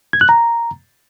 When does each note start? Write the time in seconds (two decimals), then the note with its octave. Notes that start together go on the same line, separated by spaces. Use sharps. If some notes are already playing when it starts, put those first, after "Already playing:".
0.13 G#6
0.21 F#6
0.29 A#5